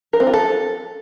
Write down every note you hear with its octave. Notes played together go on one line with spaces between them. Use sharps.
A#4
C4
F4
A4